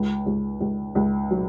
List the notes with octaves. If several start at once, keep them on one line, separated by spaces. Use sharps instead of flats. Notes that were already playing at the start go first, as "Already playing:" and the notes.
Already playing: C#2
C#2
C#2
C#2
F#3